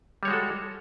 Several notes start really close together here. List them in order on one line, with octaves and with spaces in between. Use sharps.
G3 C#5 G#3 F#4 A4